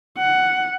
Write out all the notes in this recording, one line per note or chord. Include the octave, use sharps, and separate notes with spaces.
F#5